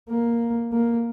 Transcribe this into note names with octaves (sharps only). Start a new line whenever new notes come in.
A#3
A#3